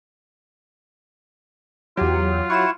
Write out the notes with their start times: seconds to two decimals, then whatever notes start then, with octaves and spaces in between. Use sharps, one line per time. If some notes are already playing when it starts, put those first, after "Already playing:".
1.97 E2 F#3 F4 G4
2.50 E4 F#5 C#6 E7